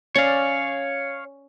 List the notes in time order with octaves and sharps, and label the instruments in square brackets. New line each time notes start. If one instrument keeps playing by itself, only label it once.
[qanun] C#4 D5 [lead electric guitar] C#5 F5